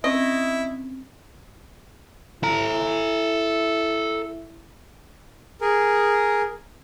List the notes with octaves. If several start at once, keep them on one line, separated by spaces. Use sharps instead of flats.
C4 C#4 E4 D#5
E4 A4 A#5
G#4 A#4